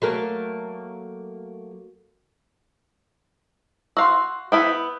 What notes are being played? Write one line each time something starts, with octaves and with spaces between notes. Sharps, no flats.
F#3 A3 A#3
F#4 F5 C6 E6
B3 E4 G5 D#6